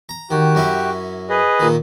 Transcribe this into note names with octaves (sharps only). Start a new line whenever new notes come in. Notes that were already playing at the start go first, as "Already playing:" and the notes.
A#5
D#3 F#4 G4
F#2 C#4 E4
G#4 B4 D#5
A#2 D#3